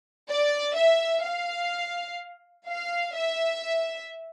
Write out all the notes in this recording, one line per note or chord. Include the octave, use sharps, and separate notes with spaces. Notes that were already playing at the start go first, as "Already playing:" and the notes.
D5
E5
F5
F5
E5